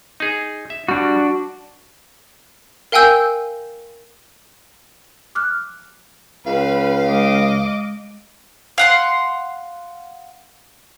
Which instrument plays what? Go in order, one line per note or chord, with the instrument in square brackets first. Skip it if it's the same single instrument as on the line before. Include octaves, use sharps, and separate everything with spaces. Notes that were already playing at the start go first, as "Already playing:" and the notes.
[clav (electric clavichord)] D#4 G#4
E5
[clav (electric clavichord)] G3 [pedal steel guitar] D4 F#4
[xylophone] A#4 F5 G5 G#5 E6 G6
[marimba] D6 F6 F#6
[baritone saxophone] C#2 [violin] B4 [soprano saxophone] F5
[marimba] G#3 [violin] D#5 D6
[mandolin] F5 F#5 C6